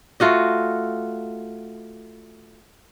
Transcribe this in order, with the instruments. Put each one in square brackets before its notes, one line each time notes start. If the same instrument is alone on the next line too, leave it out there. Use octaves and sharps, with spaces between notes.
[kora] A3 F4 F#4 D#5